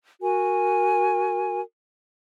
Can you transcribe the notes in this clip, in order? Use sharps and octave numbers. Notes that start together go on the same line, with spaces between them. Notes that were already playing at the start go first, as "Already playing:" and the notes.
F#4 A#4 G#5